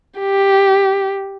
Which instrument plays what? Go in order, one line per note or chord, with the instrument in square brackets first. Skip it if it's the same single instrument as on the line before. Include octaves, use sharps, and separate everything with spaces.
[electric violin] G4